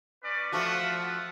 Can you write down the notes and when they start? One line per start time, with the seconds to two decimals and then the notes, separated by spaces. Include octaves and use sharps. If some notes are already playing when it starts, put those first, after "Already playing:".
0.23 C#4 B4 D5
0.52 F3 A3 F4 F#4 E5 F#5